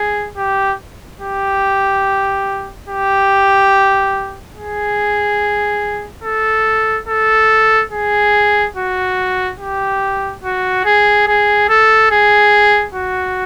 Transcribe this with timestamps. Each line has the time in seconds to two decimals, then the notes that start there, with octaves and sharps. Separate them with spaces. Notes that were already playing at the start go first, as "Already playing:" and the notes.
Already playing: G#4
0.37 G4
1.21 G4
2.88 G4
4.57 G#4
6.24 A4
7.08 A4
7.92 G#4
8.76 F#4
9.60 G4
10.44 F#4
10.85 G#4
11.27 G#4
11.69 A4
12.11 G#4
12.95 F#4